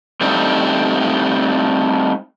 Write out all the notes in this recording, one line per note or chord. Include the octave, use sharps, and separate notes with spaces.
G3 A3 C4 D4 D#4